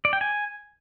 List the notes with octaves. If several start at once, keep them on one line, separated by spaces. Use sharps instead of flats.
D5
G5
G#5